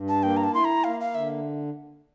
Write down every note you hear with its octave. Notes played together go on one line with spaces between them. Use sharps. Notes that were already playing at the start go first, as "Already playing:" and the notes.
Already playing: G2
A5
A#3 G5
A#5
A5
E4 C6
A#5
A#3 F5
F5
D3 E5